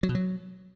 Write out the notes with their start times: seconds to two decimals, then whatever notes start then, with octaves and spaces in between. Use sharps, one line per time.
0.03 F#3
0.09 B2
0.15 F#3